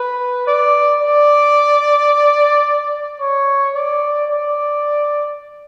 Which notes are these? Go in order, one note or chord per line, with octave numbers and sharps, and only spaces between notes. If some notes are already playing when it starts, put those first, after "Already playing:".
Already playing: B4
D5
D5
C#5
D5
D5